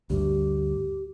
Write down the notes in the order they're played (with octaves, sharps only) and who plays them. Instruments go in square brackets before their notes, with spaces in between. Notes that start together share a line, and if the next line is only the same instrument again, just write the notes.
[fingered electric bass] D2 G2 [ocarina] G4